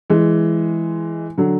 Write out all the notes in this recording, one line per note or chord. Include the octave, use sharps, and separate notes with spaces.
E3 G#3
D3 F#3